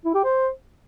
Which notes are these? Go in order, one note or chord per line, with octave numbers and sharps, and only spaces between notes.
E4
G4
C5